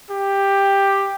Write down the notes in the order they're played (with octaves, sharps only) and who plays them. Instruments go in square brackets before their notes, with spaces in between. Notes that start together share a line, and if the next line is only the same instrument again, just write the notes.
[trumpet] G4